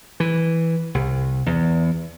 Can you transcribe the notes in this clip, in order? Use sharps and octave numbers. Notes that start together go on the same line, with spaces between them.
E3
C2
E2